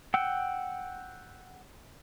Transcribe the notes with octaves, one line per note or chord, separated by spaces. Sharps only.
F#5 G5 E6